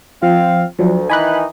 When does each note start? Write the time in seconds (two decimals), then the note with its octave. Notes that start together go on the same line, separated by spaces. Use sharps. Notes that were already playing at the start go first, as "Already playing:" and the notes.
0.23 F3 C4 F5
0.79 D2 F3 F#3
1.10 D#3 E3 D#4 G#5 B5 F#6